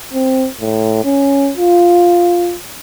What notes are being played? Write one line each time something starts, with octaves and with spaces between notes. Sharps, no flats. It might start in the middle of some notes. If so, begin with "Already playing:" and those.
C4
A2
C#4
F4